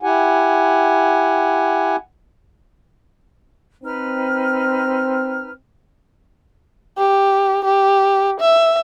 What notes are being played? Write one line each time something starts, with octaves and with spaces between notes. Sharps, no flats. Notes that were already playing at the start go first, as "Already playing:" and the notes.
E4 G4 F#5 G#5
C4 D#4 B4 F6
G4
G4
E5